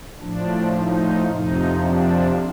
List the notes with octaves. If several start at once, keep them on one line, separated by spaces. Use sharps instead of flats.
A2 F3 D4
D#4
F2 C3 F3 D#4
D4